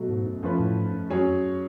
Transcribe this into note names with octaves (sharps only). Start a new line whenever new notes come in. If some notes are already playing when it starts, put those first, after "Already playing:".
Already playing: B2 F#3 A3
G#2
F#2
F#2 F3 A3 C#4 F4 B4
A2
G#2
F#2
F2 F#3 C#4 G#4 C#5
F#2